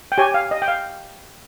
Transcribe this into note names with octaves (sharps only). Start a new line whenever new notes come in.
G5
G4 C#5 G#5
F5
D#5
G5
F5